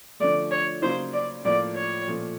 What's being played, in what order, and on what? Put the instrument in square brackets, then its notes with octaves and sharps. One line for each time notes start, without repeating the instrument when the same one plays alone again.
[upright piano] D3 F3 A3 [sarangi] D5
[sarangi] C#5
[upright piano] C#3 F#3 A#3 D#4 [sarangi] C5
[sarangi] D5
[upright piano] A2 F3 A#3 [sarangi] D5
[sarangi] C#5
[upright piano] A#2 F3 A3